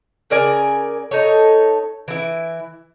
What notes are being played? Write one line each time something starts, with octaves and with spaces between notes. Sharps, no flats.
C#3 A#4 D5 G#5
D#4 A4 C#5
E3 E4